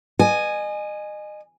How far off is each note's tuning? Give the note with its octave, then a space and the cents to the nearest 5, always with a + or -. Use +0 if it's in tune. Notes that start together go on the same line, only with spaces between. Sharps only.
D#5 -30 G#5 +0